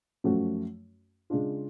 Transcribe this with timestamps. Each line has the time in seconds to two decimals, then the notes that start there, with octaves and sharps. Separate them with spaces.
0.24 F#2 F3 A3 C#4 F#4
1.30 C#3 G#3 D4 F4